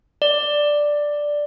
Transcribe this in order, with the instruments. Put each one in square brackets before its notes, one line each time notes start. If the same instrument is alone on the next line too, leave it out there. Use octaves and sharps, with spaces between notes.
[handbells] D5